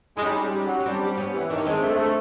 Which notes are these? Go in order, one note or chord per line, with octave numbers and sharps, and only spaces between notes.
G#3 E4
G3 C#4 D#4
G#3
G3
F#3
C#4
G3 C4 D4
G3
B3 C#4
E3
D#3 D4
C#4
G#3 C4 D4
A3
A3